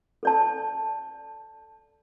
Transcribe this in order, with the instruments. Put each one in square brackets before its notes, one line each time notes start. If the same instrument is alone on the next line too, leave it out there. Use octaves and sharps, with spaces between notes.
[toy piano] A4 D5 A5